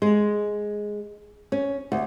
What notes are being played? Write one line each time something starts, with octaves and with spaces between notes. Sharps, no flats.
G#3
C#4
D2